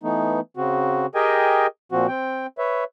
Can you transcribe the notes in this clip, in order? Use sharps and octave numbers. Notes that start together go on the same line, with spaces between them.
E3 A3 B3 D#4
C#3 C4 F#4
G4 G#4 A#4 D#5 G5 G#5
A#2 F3 C4 F#4
C4 G5
B4 C#5 E5